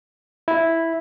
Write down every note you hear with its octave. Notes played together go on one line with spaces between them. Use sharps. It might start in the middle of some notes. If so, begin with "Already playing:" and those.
E4